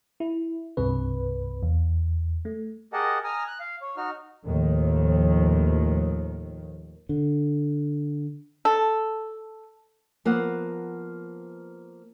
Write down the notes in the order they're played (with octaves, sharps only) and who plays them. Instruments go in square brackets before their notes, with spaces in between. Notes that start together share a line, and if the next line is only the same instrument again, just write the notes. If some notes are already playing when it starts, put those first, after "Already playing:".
[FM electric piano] E4
C2 G2 C3 B4
E2
A3
[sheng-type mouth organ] G4 G#4 A#4 D#5 F#5 A5
G#5 A#5 D#6 F6
F#6
F5
C#5
D#4 F#4 F6
[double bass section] D#2 A2 D#3 F3
[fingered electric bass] D3
[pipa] A4
[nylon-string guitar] F3 A#3 B3 F#5